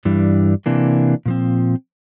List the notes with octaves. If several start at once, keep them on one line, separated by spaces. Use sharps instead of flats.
G2 E3 G3 D4
C3 E3 A#3 D4
A#2 F3 C4